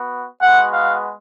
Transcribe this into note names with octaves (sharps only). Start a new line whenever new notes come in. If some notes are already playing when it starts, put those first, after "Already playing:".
Already playing: B3 F#4
G#3 B3 F#4 F#5
F5